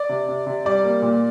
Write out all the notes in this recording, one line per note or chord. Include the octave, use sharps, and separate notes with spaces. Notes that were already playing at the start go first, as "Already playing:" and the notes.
Already playing: D5
C3
C3
C3
G3 D5
A#3
A#2